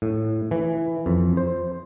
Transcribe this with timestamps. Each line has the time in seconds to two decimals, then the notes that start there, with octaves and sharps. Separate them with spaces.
0.02 A2
0.51 E3
1.06 F2
1.37 C5